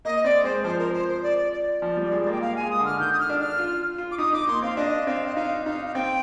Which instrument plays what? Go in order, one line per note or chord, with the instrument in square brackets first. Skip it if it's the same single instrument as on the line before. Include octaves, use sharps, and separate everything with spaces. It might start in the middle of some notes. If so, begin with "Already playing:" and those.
[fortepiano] A#3 [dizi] D#5
[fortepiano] C4 [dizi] D5
[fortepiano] G#3 [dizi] C5
[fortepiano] F3 [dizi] C5
[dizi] A#4
C5
C5
D5
D5
[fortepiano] F3
G3
G#3
A#3
[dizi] G5
[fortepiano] A#3 [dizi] F5
[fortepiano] G#3 [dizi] G#5
[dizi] D#6
[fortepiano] D3
[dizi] F6
[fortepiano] D#3 [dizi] G6
[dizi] D#6
F6
[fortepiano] D4
[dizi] F6
[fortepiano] F4
F4
[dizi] D6
[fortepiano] D#4 [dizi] D#6
[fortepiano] D#4 [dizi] D6
[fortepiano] A#3 [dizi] C6
[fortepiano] C4 [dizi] F5
[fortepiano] D4 [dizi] D#5
[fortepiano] C4 [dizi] F5
[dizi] D#5
[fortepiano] D#4 [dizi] F5
[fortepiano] D#4 [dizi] F5
[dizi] F5
[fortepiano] C4 [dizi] G5